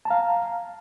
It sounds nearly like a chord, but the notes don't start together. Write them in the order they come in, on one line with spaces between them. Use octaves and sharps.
A5 A#5 F5